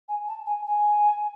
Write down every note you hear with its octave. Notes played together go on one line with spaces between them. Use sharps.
G#5
A5
G#5
G#5